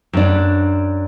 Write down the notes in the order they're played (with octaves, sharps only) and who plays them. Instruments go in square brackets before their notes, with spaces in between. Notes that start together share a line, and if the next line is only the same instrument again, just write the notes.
[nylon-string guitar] F#2 D4